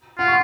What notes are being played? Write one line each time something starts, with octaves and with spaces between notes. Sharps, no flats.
F4 F#5
C#6